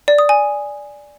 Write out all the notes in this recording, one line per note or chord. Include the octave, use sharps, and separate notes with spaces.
D5
D#6
G#5